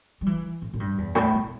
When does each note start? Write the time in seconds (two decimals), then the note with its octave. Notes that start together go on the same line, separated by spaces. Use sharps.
0.21 G3
0.26 E3
0.62 A2
0.73 A2
0.80 G2
0.98 E2
1.15 A2
1.33 B2